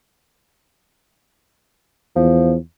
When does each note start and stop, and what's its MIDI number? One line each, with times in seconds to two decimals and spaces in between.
2.16 2.56 40
2.16 2.54 53